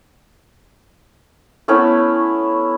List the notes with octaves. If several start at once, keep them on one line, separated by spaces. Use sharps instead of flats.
A3 B3 C#4 E4